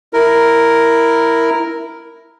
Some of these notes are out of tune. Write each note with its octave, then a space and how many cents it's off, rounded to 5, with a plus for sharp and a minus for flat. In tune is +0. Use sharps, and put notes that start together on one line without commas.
E4 +0 A#4 +0